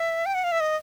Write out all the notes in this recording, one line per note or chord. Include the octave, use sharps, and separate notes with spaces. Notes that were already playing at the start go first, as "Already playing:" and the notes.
Already playing: E5
G5
F#5
F5
E5
D#5